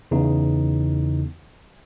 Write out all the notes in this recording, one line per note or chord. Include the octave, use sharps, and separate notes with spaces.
E2 C#3 E3 D#4